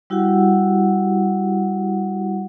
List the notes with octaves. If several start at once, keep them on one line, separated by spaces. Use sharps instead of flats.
G3 E4 F#4 G4 F#5